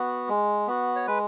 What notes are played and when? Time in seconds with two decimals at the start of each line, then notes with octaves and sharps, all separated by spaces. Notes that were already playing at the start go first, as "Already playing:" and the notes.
Already playing: B3 F#4
0.29 G#3
0.68 B3 F#4
0.96 C#5
1.07 G#3 B4